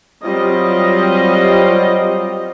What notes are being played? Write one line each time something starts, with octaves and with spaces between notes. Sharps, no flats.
F#3 G3 C4 F4 D#5